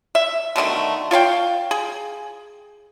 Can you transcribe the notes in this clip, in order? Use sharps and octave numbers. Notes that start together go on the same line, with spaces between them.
E5
B2 D3 D#3 A3
F4 C#5 F5 G5
G#4